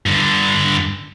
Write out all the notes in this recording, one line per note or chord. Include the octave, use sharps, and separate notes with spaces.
G2 D3